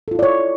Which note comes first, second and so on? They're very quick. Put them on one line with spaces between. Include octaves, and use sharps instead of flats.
A4 F4 E4 D5 C#5